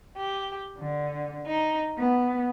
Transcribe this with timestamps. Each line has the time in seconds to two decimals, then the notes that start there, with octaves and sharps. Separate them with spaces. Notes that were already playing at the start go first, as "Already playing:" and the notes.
0.18 G4
0.78 D3
1.47 D#4
1.97 B3